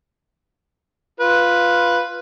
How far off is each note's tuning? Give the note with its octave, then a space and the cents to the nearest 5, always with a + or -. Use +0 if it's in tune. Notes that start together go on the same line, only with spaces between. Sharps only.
F4 +0 B4 +0